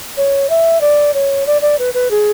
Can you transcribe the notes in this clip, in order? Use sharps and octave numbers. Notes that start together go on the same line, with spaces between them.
C#5
E5
D5
C#5
D5
D5
B4
B4
G#4